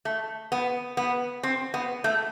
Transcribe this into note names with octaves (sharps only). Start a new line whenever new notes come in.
A3
B3
B3
C4
B3
A3